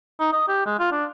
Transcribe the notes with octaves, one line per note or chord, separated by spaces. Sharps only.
D#4
D#5
G4
G#3
F4
D4